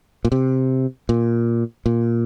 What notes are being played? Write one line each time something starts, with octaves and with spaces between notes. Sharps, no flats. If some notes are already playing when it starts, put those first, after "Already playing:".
A#2
C3
A#2
A#2